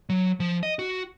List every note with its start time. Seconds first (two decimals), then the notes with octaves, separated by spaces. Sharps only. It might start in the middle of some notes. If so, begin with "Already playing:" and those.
0.09 F#3
0.40 F3
0.63 D#5
0.79 F#4